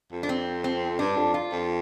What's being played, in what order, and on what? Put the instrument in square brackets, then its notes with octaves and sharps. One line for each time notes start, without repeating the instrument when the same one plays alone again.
[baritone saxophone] F2
[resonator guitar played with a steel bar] D4
C4
C4
[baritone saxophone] G2 [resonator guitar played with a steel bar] D4
[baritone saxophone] F2
[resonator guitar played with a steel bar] F4
[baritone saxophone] F2